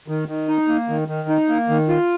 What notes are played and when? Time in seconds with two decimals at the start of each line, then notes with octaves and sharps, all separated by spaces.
0.08 D#3
0.28 D#3
0.48 D#4
0.68 A#3
0.89 D#3
1.08 D#3
1.29 D#4
1.48 A#3
1.69 D#3
1.89 F4